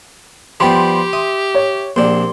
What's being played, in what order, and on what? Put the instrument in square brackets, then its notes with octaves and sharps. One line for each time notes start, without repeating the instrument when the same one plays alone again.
[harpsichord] F3 G3 B3 [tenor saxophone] G4 [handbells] G5 B5 [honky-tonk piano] C6
[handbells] E5 [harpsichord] D#6
[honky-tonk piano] C#5
[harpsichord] A#1 D4 [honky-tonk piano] A#3 D5 [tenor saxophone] C4 [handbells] G4 C6